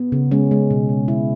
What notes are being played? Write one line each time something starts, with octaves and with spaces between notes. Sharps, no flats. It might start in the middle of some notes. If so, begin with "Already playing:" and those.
Already playing: B3
C#3
G#3 C#4
G#3
B2
B2
G#3 E4